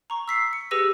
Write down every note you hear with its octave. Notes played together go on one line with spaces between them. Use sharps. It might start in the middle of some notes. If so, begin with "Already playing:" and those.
A#5 C#6
E6 B6 C7
C#7
G4 G#4 B4 E6 A#6 D#7